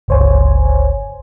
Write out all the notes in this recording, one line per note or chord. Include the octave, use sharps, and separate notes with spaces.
G1 C#2 C5 C#5 G#5